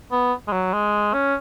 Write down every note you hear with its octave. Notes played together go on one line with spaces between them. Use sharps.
B3
G#3
F#3
G#3
C#4